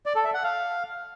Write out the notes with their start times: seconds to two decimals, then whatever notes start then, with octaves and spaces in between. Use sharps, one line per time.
0.06 D5
0.15 A4
0.25 E5
0.34 F#5
0.44 F5